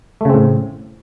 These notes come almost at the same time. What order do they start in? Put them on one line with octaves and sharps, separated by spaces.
A3 C#3 C4 A2